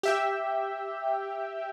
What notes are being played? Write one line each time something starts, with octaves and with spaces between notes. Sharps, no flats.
G4 E5 G5